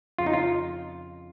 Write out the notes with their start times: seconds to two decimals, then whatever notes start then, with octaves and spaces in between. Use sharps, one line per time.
0.19 F2 C#3 F4
0.26 D#4
0.34 F4